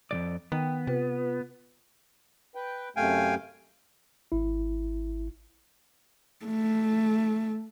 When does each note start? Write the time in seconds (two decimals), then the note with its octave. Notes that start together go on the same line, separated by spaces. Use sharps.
0.11 F2 D#3 D5
0.52 D#3 B3 G5
0.87 C3 F4 B4
2.55 B4 G5
2.96 F#2 C3 A3 F5 G5 G#5
4.32 G#1 E4
6.45 A3